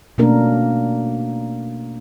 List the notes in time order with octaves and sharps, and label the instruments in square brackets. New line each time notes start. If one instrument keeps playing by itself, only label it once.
[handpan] B2 A3 A#3 C#4 D4 A#4